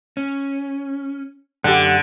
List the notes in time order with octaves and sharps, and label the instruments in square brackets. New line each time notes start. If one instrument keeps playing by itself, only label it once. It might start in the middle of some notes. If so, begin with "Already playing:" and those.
[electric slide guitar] C#4
[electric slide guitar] F#2 G5 [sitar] D3 [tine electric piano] G4 F#5